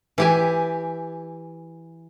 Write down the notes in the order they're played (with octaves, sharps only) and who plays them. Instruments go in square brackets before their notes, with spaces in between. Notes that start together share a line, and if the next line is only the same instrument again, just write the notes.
[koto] E3 G4 G#5